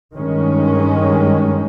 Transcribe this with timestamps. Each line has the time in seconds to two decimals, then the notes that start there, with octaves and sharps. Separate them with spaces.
0.16 G2 D#3 G#3 C#4